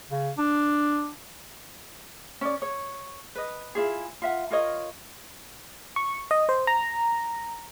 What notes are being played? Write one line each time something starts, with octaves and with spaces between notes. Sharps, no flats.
C#3
D4
C#4 D5
C#5
B4 D#5
E4 F4 G#4
F4 E5 F#5
F4 A#4 C#5 D#5
C#6
D#5
C5
A#5